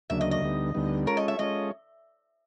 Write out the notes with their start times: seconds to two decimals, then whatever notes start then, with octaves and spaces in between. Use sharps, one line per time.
0.10 D2 C#3 F#3 A#3 D4 E5
0.21 D#5
0.31 D#5
0.41 D2 D3 G3 B3 D#4
0.74 D2 D3 G3 B3 D#4
1.06 G#3 C#4 F4 A4 A#4 C#5
1.17 D#5
1.28 E5
1.39 G#3 C#4 F4 A4 C#5 D#5